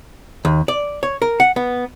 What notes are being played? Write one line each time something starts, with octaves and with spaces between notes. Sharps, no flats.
D#2
D5
C#5
A#4
F#5
B3